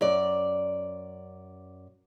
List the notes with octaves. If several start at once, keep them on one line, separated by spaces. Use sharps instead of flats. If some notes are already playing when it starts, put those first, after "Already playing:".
F#2 D5